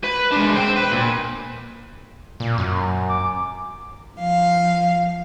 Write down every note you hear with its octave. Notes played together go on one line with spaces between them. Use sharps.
B4
G#3 D4
C5 G5
B4
A#2
A#2
F#2
D6
F3 F5